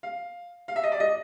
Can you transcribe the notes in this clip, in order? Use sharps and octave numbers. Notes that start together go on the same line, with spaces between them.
F5
F5
E5
D#5
D5
D#5